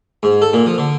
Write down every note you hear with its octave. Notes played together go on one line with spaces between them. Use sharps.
G#2
A4
A#2
F3
D3